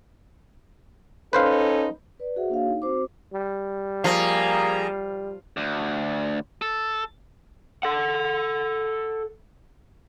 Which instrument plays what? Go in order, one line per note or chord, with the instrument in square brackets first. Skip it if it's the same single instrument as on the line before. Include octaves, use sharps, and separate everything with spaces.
[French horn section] C#4 D#4 A4 [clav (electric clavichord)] B4 C5 F5
[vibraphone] B4 D5
F#4 G#4 C5 E5 F#5
A#3 D4 F#4 G#4 C#5 F5
D#4
C4 F#4 C5 D6
[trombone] G3
[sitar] F3 [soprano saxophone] A#3 [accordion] G#4 A#5
[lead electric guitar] D2
A4
[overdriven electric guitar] A4 F#5